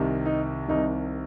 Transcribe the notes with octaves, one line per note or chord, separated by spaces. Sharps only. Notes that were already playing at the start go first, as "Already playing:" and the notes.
Already playing: C2 C3 D#3
D#4
C2 C3 D#3 D#4